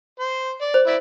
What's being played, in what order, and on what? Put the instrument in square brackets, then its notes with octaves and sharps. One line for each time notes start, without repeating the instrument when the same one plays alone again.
[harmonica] C5
D5
[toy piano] C5
[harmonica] E4 D5 E5